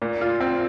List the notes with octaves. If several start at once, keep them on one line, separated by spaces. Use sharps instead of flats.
A#2
F4
C4